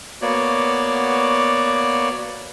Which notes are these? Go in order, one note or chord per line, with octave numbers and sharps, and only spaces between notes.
A#3 B3 F#4 C#5 D5